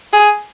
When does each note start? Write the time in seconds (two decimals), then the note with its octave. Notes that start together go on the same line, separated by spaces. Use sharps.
0.13 G#4